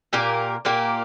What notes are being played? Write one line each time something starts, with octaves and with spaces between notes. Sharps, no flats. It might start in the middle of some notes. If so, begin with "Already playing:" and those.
A#2 A#3 G4 A#4
A#2 A#3 G4 A#4